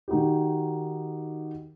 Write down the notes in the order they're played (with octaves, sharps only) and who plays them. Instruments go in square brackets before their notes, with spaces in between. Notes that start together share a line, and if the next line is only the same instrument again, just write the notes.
[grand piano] D#3 D#4 F#4 G4